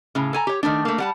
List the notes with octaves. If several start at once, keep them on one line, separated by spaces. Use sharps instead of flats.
A2 C#3
A4 G#5 A#5
G4 C#5
D#3 F#3 A3 D4
A3 A#3
G3 F#5 A5